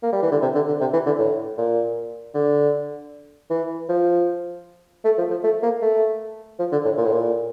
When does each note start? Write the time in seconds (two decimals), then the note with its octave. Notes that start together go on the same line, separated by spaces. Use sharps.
0.03 A#3
0.13 G3
0.22 E3
0.32 D3
0.42 C3
0.55 D3
0.68 D3
0.80 C3
0.94 E3
1.06 D3
1.19 A2
1.58 A#2
2.35 D3
3.50 E3
3.89 F3
5.05 A3
5.18 F3
5.30 F3
5.44 A3
5.63 A#3
5.82 A3
6.59 F3
6.72 D3
6.85 A2
6.97 A#2
7.05 A2
7.12 A#2